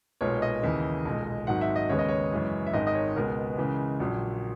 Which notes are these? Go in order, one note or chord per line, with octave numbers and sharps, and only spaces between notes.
B1 A#2 G#3 B3 C#5
D#5
D#2 C#3 E3
B1 A#2 G#3
G#1 G#2 F#3 F#5
E5
D#5
D#2 C#3 G#3 B3 C#5
D#5
C#5
F#2 C#3 E3 G#3
E5
G#1 G#2 D#3 G#3 D#5
D#5
C#5
C#2 B2 G#3 B3 A#4
C#2 C#3 E3 G#3
A#1 A#2 F#3